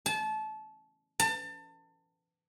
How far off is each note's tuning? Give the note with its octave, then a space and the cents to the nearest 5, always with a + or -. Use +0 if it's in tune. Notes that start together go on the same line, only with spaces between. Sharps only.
A5 -25
A5 +30